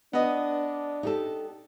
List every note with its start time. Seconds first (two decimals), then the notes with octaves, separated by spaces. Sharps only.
0.13 B3 D4 D#5
1.03 D#4 G4 A4